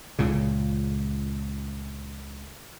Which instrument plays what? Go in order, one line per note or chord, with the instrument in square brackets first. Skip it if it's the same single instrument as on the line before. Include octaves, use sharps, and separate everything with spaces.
[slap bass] C#2 A#2 C#3